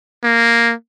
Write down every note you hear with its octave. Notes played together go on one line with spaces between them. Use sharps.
A#3